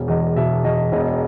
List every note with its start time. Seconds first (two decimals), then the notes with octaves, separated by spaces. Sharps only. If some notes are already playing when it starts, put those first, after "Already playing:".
Already playing: E1
0.08 E2 D#5
0.37 B2 E5
0.64 E2 D#5
0.92 E1 D#5